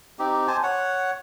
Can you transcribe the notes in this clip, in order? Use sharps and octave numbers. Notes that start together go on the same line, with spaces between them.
C4 D#4 G4
C5 G#5 A5
C#5 F#5